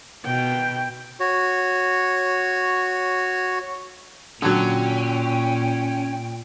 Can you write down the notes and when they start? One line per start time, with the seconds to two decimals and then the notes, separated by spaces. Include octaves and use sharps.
0.25 B2 G5
1.20 F#4 C#5
4.42 A#2 D3 F#3 C#4 G5